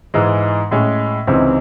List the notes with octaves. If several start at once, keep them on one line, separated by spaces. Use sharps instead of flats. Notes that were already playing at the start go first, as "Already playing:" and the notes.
G#2 E3 G#3
A2 G#3 C#4
C#2 C3 E3 C4 D#4